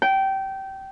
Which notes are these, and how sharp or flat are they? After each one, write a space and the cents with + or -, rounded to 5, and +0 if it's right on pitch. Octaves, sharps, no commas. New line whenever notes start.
G5 -20